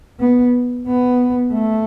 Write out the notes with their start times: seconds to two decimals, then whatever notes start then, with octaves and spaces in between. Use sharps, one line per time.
0.20 B3
0.87 B3
1.53 A3